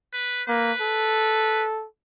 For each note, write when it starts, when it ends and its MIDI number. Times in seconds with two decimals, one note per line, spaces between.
0.14 0.43 71
0.48 0.72 58
0.48 1.65 71
0.81 1.86 69